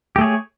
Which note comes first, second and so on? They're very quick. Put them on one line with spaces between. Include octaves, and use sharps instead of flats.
G4 A3 G#4 C#5